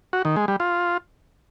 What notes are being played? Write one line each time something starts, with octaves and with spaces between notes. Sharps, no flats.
F#4
D#3
G#3
G3
F4